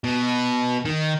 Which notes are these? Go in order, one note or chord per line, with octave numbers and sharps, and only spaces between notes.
B2
D#3